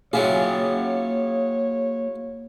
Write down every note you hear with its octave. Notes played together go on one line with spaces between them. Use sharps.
F#3 A#3 E4 F4 G#4 C#5 F#5 G5